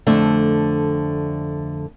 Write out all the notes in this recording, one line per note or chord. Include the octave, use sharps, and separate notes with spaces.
F2 D3 A3 E5